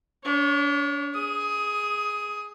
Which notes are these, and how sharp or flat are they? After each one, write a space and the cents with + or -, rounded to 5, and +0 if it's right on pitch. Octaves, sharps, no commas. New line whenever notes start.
D4 -40 C#5 +0
G#4 +0 D#6 +20